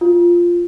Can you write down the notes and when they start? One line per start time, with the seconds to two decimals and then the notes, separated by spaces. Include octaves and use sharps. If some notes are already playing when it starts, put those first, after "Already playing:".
0.01 F4